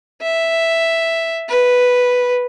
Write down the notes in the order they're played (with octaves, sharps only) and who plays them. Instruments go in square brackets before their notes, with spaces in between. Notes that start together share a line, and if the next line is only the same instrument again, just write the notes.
[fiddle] E5
B4